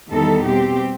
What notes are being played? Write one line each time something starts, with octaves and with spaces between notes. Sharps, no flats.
E2 D#3 G3 B3 D#4 A4
B2 G3 C4 G4